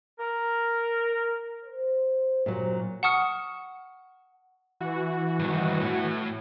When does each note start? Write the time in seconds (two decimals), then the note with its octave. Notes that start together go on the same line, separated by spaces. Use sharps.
0.19 A#4
1.65 C5
2.46 F#1 A#2 F#3 G4 C5
3.03 F#5 A5 C#6 D#6 F6 C#7
4.80 E3 F#4
5.39 G2 D#3
5.80 A2 A3